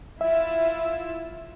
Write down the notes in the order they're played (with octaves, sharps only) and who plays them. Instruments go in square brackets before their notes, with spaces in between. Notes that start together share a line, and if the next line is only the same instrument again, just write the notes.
[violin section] E4 F4 E6 [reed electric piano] E5